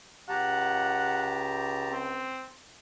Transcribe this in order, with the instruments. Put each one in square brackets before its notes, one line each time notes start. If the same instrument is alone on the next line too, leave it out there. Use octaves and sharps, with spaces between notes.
[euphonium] C#2 [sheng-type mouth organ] G4 A5 A#5 [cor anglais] F#5
[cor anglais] C4